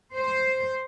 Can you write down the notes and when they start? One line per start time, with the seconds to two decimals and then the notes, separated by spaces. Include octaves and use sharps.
0.15 C5